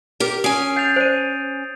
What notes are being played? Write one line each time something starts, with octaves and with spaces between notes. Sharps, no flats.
G4 A#4
C#4 G#5 D#6 C7 D7
F#5 G6 A6 F7
C5 D5 D7 D#7